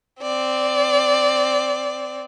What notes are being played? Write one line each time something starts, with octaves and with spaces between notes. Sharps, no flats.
C4 D5